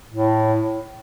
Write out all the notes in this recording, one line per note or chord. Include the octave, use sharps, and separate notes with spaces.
A2